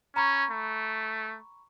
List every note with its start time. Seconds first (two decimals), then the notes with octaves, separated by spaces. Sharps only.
0.16 C#4 A#5 B5 C#6
0.51 A3